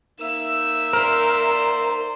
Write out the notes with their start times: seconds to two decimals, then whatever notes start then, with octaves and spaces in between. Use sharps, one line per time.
0.20 A#3 D#4 E5 E6
0.93 A#4 C5 D5